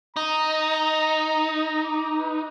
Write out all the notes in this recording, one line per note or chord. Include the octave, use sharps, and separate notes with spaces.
D#4 A#5
D6
B4